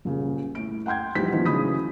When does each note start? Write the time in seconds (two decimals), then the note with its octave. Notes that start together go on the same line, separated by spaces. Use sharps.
0.05 D#1 C#3
0.55 A2 D7
0.86 F#5 G5 C6 G6 G#6
1.15 A#1 E3 G3 D#4 C5 B6
1.32 A2 D#3 F3 B3 D4
1.45 C#3 E3 F#3 B5 D#6 B6